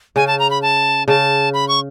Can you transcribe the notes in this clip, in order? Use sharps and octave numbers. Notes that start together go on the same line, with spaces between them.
C#3 G#5
A5
A#5
B5
A5
C#3 A5
B5
C#6